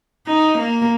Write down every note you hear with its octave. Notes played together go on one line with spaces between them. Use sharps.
D#4
A#3